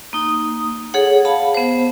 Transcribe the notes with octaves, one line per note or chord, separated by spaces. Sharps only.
A#3 D#4 D#6
G#4 A4 C#5 F#5
F5 A5 B5
B3 C5